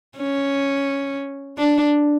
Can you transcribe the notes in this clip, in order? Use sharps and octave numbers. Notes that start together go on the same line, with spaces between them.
C#4
D4